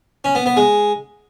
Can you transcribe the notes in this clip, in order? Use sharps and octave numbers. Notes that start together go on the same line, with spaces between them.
C#4
B3
B3
G#3